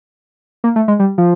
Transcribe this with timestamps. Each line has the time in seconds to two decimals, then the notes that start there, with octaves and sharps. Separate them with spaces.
0.64 A#3
0.76 A3
0.88 G#3
0.99 G3
1.18 F3